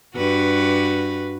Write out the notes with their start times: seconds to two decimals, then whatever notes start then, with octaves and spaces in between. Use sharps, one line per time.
0.16 G2 F#4 B4